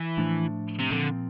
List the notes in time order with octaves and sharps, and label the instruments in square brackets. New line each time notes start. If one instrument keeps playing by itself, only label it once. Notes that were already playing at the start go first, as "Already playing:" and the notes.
Already playing: [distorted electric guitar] E3
[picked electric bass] A2 F3 A3 D4
[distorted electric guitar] C3
[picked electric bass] A#2 F3 C4 [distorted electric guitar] D3